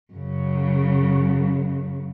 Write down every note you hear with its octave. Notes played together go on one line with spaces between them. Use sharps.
F#2 C#3